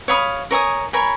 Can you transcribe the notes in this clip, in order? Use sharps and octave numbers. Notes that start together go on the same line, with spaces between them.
C#5 F5 B5 D#6
A#4 C#5 G#5 D#6
A#4 C#5 G#5 B5